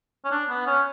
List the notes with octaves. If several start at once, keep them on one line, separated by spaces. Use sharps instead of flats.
C#4
D4
B3
C#4